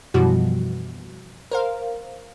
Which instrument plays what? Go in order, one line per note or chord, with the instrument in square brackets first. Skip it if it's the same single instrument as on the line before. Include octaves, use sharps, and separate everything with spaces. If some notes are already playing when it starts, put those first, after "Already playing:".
[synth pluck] F#2 B2 E3 F3 G3 F#4
A#4 C5 F5